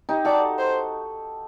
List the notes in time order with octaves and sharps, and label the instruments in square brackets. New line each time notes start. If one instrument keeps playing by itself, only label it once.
[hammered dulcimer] D#4 G4
[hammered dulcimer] F#4 A4 [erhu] D5
[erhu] C5